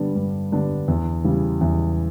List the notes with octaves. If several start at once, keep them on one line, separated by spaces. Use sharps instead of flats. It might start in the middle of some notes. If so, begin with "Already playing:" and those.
Already playing: G2 D3 G3 B3 D4
G2
D3 G3 B3 D4
E2
C#3 E3 G3
E2